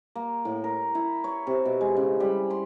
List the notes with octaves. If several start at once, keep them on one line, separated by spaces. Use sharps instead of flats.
A#3
A2
A#4
E4
C#5
C3
B2
G#3
C#3
G3
C6